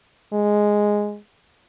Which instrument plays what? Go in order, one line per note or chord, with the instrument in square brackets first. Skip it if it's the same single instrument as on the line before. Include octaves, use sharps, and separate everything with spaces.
[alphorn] G#3